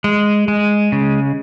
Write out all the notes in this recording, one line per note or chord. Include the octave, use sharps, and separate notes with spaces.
G#3
G#3
C#3